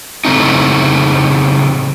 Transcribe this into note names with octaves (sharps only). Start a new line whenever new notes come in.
A2 C#3 A3 C4 D#4